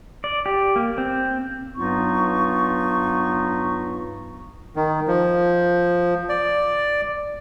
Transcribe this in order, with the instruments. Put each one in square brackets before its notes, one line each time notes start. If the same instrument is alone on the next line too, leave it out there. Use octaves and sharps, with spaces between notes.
[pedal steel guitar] D5
G4
A#3
C4
[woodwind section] G2 F#3 B3 D#4 F4 C#6
[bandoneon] D#3
F3
D5